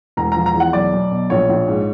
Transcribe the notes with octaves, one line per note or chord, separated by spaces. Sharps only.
E1 A#5
F3 A#5
A#5
E2
F#5
B1 D5
B1
B2
A#1 C#5
A#1
G#2